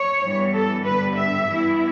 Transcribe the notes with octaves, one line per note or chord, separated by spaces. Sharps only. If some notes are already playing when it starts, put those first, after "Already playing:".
Already playing: C#5
G2 E3 G3 B3
A4
G2 D3 G3 B3 B4
E5
G2 E3 B3 E4